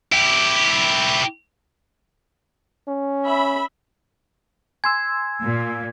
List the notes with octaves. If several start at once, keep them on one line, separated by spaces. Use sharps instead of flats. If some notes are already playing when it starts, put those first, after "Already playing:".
E4 G4
C#4
E5 B5
G#5 C6 E6 G#6
A#2